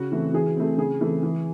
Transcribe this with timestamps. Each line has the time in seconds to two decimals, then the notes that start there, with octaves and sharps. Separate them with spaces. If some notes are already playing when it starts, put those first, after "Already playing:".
Already playing: C#3 F#4
0.12 E3 A3 C4
0.34 E3 G#4
0.56 A3 C4
0.78 C#3 G#4
1.01 E3 A3 C4
1.23 E3